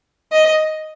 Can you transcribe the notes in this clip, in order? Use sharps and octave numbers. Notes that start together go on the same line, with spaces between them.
D#5